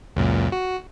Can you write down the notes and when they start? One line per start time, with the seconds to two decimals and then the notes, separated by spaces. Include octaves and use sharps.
0.16 C#2 F#2 A#2
0.52 F#4